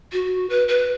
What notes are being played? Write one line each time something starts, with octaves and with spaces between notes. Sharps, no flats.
F#4
B4
B4